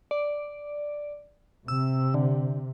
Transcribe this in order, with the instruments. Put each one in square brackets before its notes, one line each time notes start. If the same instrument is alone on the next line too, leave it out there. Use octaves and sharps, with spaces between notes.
[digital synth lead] D5
[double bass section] C3 [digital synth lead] E6
[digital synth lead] D3